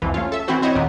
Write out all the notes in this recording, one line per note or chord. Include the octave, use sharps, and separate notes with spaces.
C2 F2 E3
A3 C#4 F4
A4 E5
E3 C4 E4 F#4 C5
C4 E4 C#5 D#5
D2 A#2 D#3 B3